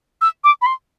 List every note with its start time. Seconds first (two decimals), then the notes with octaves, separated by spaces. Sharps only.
0.21 E6
0.44 D6
0.62 B5
0.66 C6